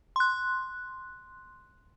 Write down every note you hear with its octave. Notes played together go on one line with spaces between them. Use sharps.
C6 F#6